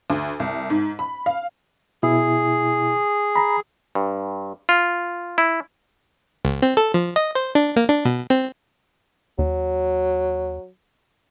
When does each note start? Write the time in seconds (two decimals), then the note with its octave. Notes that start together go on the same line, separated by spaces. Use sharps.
0.10 D2
0.40 C2
0.70 G#2
0.99 B5
1.26 F5
2.03 B2 E4 G#4
3.36 A#5 B5
3.95 G2
4.69 F4
5.38 E4
6.45 C#2
6.62 C4
6.77 A4
6.94 F3
7.16 D#5
7.35 C5
7.55 D4
7.76 A#3
7.89 D4
8.05 B2
8.30 C4
9.39 D#2 F#3